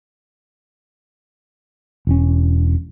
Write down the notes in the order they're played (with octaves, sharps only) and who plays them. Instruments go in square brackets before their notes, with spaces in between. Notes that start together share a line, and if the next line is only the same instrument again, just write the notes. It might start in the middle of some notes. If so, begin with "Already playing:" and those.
[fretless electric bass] E1 C#4